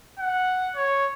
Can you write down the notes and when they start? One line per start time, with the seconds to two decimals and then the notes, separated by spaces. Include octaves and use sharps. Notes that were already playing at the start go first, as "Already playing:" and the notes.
0.19 F#5
0.76 C#5